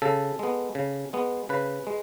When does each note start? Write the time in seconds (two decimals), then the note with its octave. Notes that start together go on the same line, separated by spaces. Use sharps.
0.02 C#3 A4
0.39 G#3 B3
0.75 C#3
1.13 G#3 B3
1.49 C#3 B4
1.87 G#3